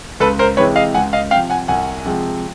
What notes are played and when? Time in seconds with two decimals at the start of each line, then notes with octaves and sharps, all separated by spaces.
0.20 C#2 A4 B4
0.39 A#4 C5
0.57 C3 E3 G#3 B4 C#5
0.76 D#5 F5
0.94 C#2 F#5 G#5
1.13 D#5 F5
1.31 C3 F3 F5 G5
1.50 F#5 G#5
1.68 C2 F#5 G#5
2.05 C3 F3 G#3